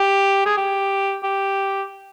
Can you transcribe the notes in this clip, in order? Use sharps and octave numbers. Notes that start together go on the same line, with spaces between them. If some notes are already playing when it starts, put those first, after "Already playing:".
Already playing: G4
G#4
G4
G4